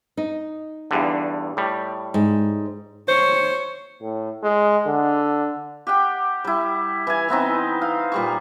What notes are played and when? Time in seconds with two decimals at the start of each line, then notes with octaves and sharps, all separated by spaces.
0.17 D#4
0.91 E2 G2 D3
1.57 A2 G3
2.14 G#2
3.08 C5 C#5
4.02 A2
4.43 G#3
4.87 D3
5.87 G4 F#5 G5
6.44 G3 E4
7.07 E3 G#5
7.29 E3 B3 C4 D#4
7.82 F5
8.12 A#2 G3 C#6